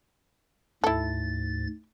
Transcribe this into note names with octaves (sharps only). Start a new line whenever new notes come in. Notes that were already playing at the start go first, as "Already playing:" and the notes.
D2 G#2 E4 A4 A6